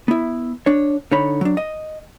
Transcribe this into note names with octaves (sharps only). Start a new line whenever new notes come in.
B3 E4
D4 C#5
D3 D#4 C#5 B5
F#3 D4
D#5